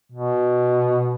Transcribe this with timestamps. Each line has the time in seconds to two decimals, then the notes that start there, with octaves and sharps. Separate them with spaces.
0.12 B2